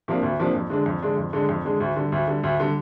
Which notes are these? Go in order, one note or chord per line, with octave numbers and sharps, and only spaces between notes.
C3 F3 A#3 D4
D2
C3 F3 A#3 D4
F2
D3 G#3 D4
F2
D3 G#3 D4
F2
D3 G#3 D4
F2
D3 G#3 D4
D2
D3 G3
D2
D3 G3
D2
D3 G3